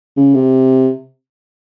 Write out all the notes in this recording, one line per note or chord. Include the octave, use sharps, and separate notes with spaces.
C#3
C3